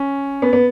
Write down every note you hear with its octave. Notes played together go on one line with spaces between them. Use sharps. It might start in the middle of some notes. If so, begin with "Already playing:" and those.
Already playing: C#4
B3
B3